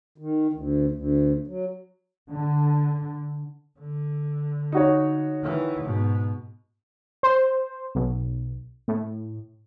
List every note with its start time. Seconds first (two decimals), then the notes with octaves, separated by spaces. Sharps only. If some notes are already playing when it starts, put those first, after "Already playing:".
0.18 D#3
0.53 D2
0.92 D2
1.47 F#3
2.30 D3
3.80 D3
4.72 D#4 F#4 C#5
5.42 D#3 E3
5.83 G#2 B2
7.23 C5
7.95 B1
8.88 A2